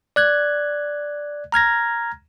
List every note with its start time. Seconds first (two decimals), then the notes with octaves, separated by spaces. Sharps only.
0.16 D5 F#6 G#6
1.52 A#5 F6 G#6 A#6